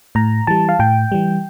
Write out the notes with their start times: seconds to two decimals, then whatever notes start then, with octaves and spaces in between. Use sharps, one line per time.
0.15 A2 A#5
0.47 E3 G3 A5
0.69 F5
0.79 A2 G5
1.12 E3 G3